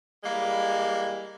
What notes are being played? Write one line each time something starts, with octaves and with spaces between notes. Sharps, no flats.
E3 G3 G#3 A#3